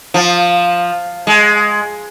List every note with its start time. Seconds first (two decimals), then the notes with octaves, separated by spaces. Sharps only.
0.14 F3
1.27 G#3